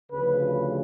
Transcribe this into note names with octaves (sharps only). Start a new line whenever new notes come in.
D2 C#3 F3 B4